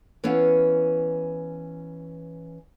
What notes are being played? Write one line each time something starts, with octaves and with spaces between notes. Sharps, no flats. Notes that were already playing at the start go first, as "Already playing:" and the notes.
E3 B3 C#4 F5